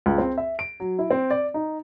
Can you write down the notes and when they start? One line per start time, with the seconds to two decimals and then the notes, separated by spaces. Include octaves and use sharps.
0.06 C#2
0.18 C4
0.38 E5
0.59 D7
0.80 F#3
0.99 E4
1.10 C4
1.31 D5
1.54 D#4